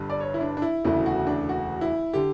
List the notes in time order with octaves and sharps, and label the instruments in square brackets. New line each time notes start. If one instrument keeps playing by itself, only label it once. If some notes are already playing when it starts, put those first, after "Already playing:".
Already playing: [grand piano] G1 G2 D3 G3
D5
C#5
E4
D4
D4
E4
E1 D2 C#3 E3 A3 E4
F#4
D4
F#4
E4
D3 G4